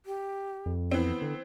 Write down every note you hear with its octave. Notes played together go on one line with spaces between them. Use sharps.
G4
F2
E3 B3 C4
D3